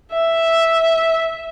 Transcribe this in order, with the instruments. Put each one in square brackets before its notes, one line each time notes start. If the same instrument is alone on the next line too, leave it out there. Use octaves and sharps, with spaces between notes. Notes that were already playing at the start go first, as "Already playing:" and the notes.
[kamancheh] E5